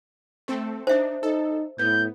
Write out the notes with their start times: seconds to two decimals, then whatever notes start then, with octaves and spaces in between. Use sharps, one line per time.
0.48 A3 C4 A4
0.87 D4 D#4 C5 E5
1.23 D#4 A4
1.79 A2 B3 G6